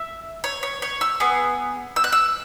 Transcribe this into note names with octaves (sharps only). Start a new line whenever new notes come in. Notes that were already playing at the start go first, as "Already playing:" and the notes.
Already playing: E5
C#5
C#5
C#5
E6
B3 G#4
E6
F#6
E6